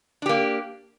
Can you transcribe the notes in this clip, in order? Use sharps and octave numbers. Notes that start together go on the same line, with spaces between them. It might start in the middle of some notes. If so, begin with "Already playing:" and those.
A#3 D4 G4